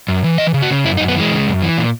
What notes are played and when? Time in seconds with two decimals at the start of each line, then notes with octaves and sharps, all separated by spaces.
0.08 F#2
0.24 E3
0.38 E3 D#5
0.54 C#3
0.62 F#4
0.70 C#3
0.85 F#2 E4
0.97 D#4
1.00 F#2
1.08 B3
1.16 E3 G#3
1.32 C#3
1.47 F#2
1.62 E3
1.78 A#2